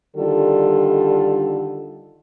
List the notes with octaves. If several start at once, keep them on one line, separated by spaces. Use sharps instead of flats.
D3 D#3 G3 F4 A4